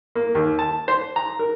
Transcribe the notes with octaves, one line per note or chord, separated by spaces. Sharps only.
A#3
D#2
A5
C5
A#5
A#4